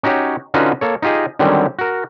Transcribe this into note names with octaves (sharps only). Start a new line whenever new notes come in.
C#4 D#4 F#4 G4 C#5
D3 C#4 D#4 F4 F#4 B4
A#3 A4 C#5
D#4 F4 G4 G#4 D#5
D3 D#3 F#3 G3 C4 C#4
F#4 A#4